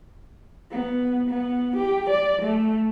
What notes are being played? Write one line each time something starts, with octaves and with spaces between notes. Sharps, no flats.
B3
B3
G4
D5
A3